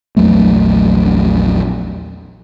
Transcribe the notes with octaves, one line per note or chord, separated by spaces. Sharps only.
A#1 E2 F#3 A3